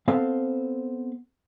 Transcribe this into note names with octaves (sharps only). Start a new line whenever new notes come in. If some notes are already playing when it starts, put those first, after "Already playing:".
B3 C4 A4 C5 F5